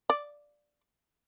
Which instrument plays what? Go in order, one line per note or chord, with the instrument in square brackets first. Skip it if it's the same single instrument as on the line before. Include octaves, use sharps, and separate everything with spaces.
[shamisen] D5